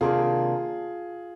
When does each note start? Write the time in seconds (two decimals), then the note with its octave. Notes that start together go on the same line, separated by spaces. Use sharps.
0.01 C3 D#3 A#3 D4 F4 G#4